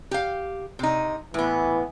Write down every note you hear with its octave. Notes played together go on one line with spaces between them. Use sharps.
G4 F5
C3 D#4
A2 E3 B3